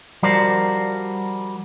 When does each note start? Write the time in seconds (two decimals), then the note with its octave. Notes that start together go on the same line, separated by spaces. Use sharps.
0.23 F3 G3 F#4 A#4 C5 D5